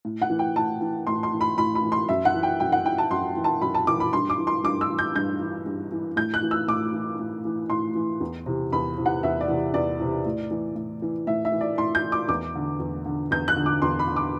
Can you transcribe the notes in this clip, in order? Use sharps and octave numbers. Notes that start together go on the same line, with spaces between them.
A2
F#5
E3
G5
A2 A5
E3
A2 C6
C6
E3
B5
A2 B5
B5
E3
C6
F#2 E5
F#5
E3
G5
F#2 G5
F#5
E3 G5
A5
F#2 C6
E3
A5
F#2 B5
A5
E3 D6
B5
G2 C6
D6
E3
C6
G2 D6
E6
E3
G6
G2 G6
E3
G2
E3
A2 G6
F#6
E3
E6
A2 D6
E3
A2
E3
A2 C6
E3
E2
C3 E3
E2 B5
C3 E3
F#5
E2 E5
D5
C3 E3
E2 D5
C3 E3
A2
E3
A2
E3
A2 E5
E5
E3
D5
A2 C6
G6
E3
D6
E2 D6
D3
E2
D3
E2 G6
F#6
D3
D6
E2 C6
B5
D3
D6